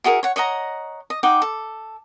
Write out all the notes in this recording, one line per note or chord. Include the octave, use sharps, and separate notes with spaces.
E4 F#4 G#4 A#4
C#5 F#5
C#5 D#5 F#5 A#5
D#5
D#4 F#5 G5 D6
A4